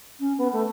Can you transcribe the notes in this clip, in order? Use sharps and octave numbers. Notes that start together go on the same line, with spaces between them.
C#4
B3
A3